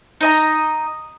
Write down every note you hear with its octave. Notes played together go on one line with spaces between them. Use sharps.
D#4 D#5 A#5